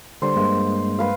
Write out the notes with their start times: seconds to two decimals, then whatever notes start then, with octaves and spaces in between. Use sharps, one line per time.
0.22 D3 G3 C5
0.36 G2 G#3 A#3
0.99 B4 F5